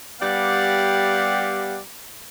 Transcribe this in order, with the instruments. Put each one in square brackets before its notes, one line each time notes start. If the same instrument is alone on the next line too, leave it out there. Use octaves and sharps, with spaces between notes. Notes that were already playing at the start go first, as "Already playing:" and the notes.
[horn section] G3 B3 G4 D5 F5 F#5